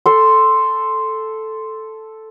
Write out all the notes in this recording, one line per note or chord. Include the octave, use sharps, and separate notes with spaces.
A4 C6